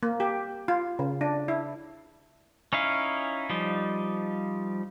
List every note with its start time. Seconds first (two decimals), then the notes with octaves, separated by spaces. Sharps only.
0.03 A#3
0.20 G4
0.68 F4
0.99 C#3
1.21 D4
1.48 E4
2.73 C#4 D#4 E4 F5
3.50 F3 G3 D#4